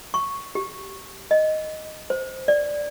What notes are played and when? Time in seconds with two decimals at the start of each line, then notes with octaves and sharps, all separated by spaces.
0.14 C#6
0.55 G4
1.31 D#5
2.10 C5
2.48 D5